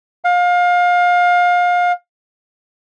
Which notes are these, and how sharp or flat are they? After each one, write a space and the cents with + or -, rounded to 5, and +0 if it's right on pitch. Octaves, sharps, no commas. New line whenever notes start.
F5 +30